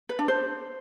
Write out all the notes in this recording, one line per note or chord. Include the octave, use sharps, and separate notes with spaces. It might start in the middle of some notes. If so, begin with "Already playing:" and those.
B4
D4
C5